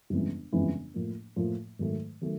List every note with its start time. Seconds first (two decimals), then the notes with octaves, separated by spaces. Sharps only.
0.10 G1 F2 C#3 E3 G#3
0.53 G1 F2 C#3 E3 G#3
0.94 A2 F3 A#3
1.36 A2 F3 A#3
1.79 G#2 D#3 F#3 A3
2.21 D#3 F#3 A3